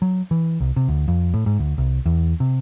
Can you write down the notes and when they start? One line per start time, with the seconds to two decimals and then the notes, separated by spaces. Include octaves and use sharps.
0.02 F#3
0.31 E3
0.60 C2
0.76 C3
0.88 D2
1.08 F2
1.34 A2
1.46 G#2
1.59 D2
1.78 C2
2.06 E2
2.40 C3